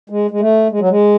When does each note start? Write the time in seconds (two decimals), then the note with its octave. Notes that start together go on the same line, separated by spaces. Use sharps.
0.10 G#3
0.31 G#3
0.40 A3
0.71 G#3
0.80 F#3
0.89 G#3